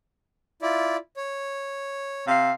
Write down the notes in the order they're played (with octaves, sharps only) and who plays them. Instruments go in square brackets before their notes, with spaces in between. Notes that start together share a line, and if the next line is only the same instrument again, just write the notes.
[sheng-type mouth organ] E4 F4 D5
C#5
[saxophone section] C3 F5